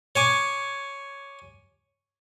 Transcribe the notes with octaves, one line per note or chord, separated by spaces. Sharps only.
C#5 G#5 D6